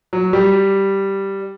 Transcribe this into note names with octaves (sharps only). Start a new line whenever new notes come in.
F#3
G3